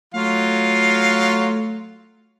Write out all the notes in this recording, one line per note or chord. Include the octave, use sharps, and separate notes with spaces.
F#3 A3 F4 F5